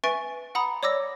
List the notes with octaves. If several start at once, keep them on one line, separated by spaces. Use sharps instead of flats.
B4 E5 G#5 C#6 A6 D7
F#5 A#5 B5 D#6
C#5 D5 D6 E6 A#6